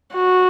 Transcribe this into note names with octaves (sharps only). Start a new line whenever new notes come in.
F#4